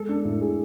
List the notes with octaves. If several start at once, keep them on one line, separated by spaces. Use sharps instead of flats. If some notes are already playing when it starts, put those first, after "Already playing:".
Already playing: G#3 A4
D4
A2
G#4